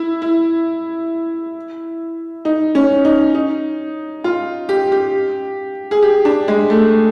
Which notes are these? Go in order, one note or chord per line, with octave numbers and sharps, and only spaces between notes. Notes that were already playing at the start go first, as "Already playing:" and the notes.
Already playing: E4
E4
D#4
C#4
D#4
D#4
F4
G4
G4
G#4
G4
D4
G#3
A3